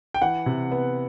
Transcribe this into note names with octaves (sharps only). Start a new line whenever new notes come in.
G5
E3 F#5
C3
B3